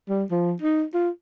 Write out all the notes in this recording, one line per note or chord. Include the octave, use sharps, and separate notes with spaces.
G3
F3
D#4
F4